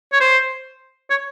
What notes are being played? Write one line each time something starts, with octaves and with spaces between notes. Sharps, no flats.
C#5
C5
C#5